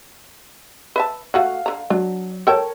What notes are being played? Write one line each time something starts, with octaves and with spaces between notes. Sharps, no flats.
B4 E5 A5
A3 F#4 F5 F#5
D3 A#5
F#3 D4
A4 A#4 C#5 G5 A5